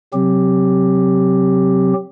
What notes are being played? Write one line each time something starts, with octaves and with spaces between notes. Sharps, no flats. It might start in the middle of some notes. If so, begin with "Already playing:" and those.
C3 F#3 C4 G4